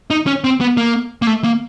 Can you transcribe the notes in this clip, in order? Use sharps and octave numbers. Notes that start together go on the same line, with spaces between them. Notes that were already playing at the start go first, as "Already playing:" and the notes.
D#4
C#4
C4
B3
A#3
A#3
A3
A#3